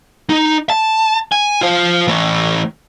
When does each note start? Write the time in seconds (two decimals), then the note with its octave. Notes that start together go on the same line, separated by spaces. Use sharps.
0.30 D#4
0.70 A5
1.32 G#5
1.61 F4 C5
2.07 E3 A3